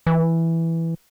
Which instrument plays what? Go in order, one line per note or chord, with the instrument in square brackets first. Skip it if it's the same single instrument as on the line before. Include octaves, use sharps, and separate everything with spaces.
[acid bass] E3